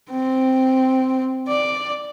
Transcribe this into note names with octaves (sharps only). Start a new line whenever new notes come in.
C4
D5